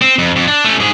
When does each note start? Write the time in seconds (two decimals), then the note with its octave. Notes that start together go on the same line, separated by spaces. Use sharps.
0.02 C4
0.19 F2
0.36 F2
0.48 D4
0.64 A3 C#4
0.80 G#2 G#4